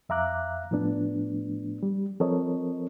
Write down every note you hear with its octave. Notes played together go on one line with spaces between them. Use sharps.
F2 E5 F5 A#5 D6 F#6
A2 F3 A3 B3 D4
G3
F3 C4 A4 A#4 C#5 D#5